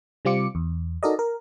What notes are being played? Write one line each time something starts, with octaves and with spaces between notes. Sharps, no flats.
C3 G3 C4 F4 D6 C#7
E2
D#4 F#4 A4 A#4 D5 D#5
A#4